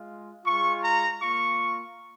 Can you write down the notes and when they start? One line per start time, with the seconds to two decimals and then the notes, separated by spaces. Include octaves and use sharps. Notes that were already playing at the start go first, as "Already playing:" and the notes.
Already playing: G#3 F4
0.44 G#3 F4 C#6
0.83 A#5
1.21 A#3 F4 C#6